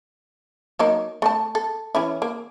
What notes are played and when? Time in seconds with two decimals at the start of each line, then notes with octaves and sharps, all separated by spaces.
0.79 F#3 A#3 D#4
1.22 A3 F#5 A5
1.55 A4
1.95 E3 C#4 E4
2.22 A#3